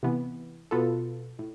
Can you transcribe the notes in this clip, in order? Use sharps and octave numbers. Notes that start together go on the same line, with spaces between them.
C3 E3 B3
B2 B3 F4 A4
A2